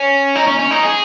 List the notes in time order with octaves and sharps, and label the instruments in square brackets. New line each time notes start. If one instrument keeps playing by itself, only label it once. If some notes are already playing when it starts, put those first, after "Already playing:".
Already playing: [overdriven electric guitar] C#4
D#4
C#4
C#4
D#4
G#4